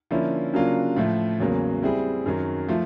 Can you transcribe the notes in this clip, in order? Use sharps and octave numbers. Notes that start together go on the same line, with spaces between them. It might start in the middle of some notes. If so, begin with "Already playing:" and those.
D3 F3 A#3 C#4 E4
C#3 F#3 A#3 D4 F4
A2 F3 A3
E2 C#3 F#3 A#3
G3 C4 E4 G#4
F#2 D#3 F#3
F3 A3